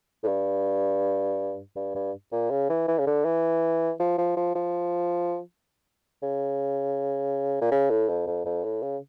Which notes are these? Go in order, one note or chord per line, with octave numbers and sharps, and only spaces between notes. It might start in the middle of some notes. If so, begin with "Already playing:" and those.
A2
G2
G2
G2
A#2
C#3
E3
E3
C#3
D3
E3
F3
F3
F3
F3
C#3
A#2
C#3
A2
F2
F2
F2
A2
C#3